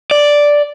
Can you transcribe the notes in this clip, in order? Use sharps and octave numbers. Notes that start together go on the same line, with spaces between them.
D5